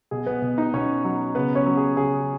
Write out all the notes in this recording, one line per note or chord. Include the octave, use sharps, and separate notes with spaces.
B2 G#4
B3 B4
B2
D#4 D#5
B2 C#4 C#5
F#3
C#3 B3 B4
C#4 C#5
F#3
G#4
C#3 G#4